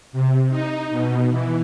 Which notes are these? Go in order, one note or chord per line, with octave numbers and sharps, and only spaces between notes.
C3
D#4
B2
E3